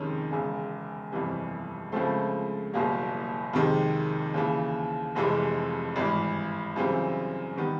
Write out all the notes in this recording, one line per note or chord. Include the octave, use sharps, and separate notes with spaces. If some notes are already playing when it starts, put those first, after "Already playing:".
Already playing: F2 C3 D#3 G#3 C#4
E1 E2 C#3
G1 F2 C3 E3 G3
C#2 C#3 F3 A3 C4
F#1 E2 B2 G3 A#3
F2 C3 D#3 G#3
D#2 C#3 E3
F1 F2 C3 E3 G#3
G#1 G2 E3
F#2 C#3 E3 G3 C4
D#3 G3 B3